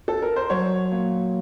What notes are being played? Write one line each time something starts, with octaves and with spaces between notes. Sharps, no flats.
A4
A#4
C5
F#3 C#5
A#2